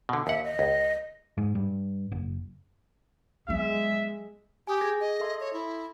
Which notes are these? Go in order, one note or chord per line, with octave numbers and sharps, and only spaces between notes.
B2 D3
D#2 E5 F#5
D#5
C#2
G#2
G2
F#1
F#3 G#3 B3 E5
G4 G#5 D#6
G#4 G#6 A#6
D#5
A4 E5 C6
C#5
E4